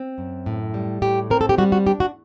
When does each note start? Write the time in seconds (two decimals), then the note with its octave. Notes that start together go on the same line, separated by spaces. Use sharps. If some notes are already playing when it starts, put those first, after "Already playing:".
Already playing: C4
0.18 F#2
0.46 A2
0.74 G3
1.02 A2 G4
1.30 C4 A#4
1.41 A4
1.49 G4
1.58 G3 F#4
1.72 F#4
1.86 D4 G4
2.00 F#4